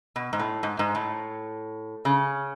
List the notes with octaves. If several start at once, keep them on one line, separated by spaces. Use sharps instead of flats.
B2
G#2
A2
G#2
G#2
A2
C#3